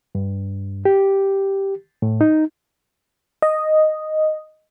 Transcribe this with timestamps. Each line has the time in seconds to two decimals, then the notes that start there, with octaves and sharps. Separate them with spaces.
0.15 G2
0.85 G4
2.02 A2
2.21 D#4
3.42 D#5